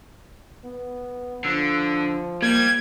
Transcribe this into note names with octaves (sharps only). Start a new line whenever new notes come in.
B3
D3 F3 E6
G3 A#3 G#6